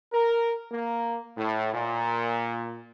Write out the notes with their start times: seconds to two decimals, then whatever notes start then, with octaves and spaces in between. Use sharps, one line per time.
0.13 A#4
0.72 A#3
1.37 A2
1.74 A#2